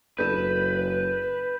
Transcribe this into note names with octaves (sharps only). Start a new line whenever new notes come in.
F#1 D4 A4 B4 G6 D#7 E7